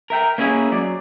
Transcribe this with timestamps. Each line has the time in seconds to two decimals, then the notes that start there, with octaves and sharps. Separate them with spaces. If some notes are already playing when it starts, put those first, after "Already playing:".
0.10 A#4 E5 G5 A#5
0.38 A#3 C#4 E4 G#4 D#5
0.72 F#3 D5